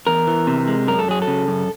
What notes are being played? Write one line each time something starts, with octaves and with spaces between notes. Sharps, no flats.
E2 A#4
E3
C3
G#3
F#2 A#4
A4
F#3 G#4
A4
C#3
F#2